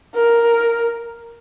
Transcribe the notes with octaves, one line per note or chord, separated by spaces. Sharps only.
A#4